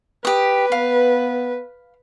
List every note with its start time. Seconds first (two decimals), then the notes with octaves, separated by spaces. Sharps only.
0.25 G4 B4 D#6
0.72 B3 F5